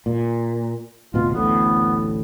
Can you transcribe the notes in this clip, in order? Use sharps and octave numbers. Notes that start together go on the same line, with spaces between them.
A#2
D1 B2 F4
A1 D2 A2 B3